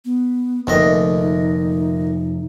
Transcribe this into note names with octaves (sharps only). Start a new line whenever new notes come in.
B3
F1 D2 A#2 D#4 D#5